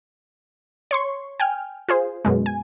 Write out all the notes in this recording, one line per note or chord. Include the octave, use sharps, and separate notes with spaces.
C#5 C6 C#6
G5 G#5 F6
F4 G#4 C5
F#2 B2 G#3
G#5